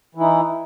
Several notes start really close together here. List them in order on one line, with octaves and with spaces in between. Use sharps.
E3 E4 D#4